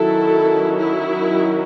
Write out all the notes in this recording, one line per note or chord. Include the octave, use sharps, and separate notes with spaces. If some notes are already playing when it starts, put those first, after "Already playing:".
Already playing: D#3 F#3 C#4 E4 A4
E4